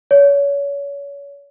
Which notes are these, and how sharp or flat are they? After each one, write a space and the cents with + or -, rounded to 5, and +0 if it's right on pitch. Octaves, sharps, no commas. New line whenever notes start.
C#5 +30